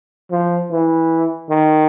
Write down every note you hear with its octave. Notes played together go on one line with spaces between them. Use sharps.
F3
E3
D#3